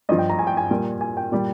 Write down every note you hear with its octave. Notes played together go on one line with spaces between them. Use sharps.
G2 F3 D#5
G5
A#5
G#5
G5
G#5
A#2 G3
G#5
G5
A#2 G3 D5